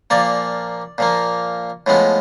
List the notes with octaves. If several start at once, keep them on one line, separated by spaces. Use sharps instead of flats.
A#2 F3 A#3 D5
A#2 F3 A#3
A2 F3 G#3 B3